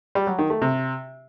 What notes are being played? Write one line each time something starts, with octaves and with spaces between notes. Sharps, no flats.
G3
F#3
D#3
A3
C3